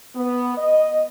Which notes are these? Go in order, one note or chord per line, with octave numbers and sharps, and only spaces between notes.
B3
D#5